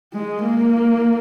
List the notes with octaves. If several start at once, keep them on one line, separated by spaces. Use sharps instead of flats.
G#3
A#3